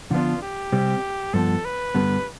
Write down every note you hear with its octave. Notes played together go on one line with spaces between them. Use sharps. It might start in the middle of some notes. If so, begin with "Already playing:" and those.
D3 F3 B3 D4 F4
G4
C3 G3 C4
G2 F3 B3 A4
B4
G2 D3 G3 B3